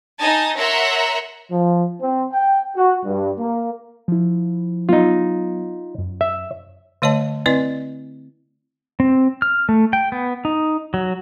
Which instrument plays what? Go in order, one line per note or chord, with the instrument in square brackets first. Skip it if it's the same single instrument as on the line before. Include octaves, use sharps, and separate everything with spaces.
[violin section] D#4 D#5 G#5 A5
A#4 C#5 E5 F#5 A#5 C6
[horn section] F3
C4
G5
F#4
G2
A#3
[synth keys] F3 E4
[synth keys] F#3 B3 [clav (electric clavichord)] D#4 F4
[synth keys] F#2
[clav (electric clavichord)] E5
[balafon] D3 A3 C#5 D#5 A5
C4 E4 B4 D5 D#5
[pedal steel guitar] C4
F6
A3
G5
B3
D#4
F#3